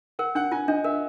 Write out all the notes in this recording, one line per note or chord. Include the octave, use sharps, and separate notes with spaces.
A#4 F#5
D4 F#5
F4 G#5
D4 D#5
A#4 E5